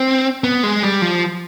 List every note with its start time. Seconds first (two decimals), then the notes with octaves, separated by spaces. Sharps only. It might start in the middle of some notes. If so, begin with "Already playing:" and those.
Already playing: C4
0.44 B3
0.63 G#3
0.83 G3
1.02 F3